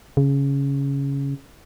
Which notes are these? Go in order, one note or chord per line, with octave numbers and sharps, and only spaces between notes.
C#3